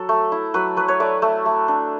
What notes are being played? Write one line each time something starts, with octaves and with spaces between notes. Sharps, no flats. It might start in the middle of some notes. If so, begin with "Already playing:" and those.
Already playing: F#3 A4
A3
E4
F#3 B4
F#3 B4
C#5
A3 D5
A3
A3
D4